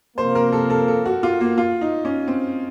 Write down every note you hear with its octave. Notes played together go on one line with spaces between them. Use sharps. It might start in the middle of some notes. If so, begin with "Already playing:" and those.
C3 F3 A#3 C5
A#4
A4
A4
A4
F#4
F4
A#3
F4
D#4
C#4
C4